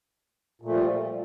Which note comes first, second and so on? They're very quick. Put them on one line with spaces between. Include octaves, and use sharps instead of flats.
A#2 A3 F3 G3